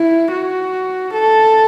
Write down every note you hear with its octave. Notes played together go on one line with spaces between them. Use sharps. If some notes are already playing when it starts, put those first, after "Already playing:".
Already playing: E4
F#4
A4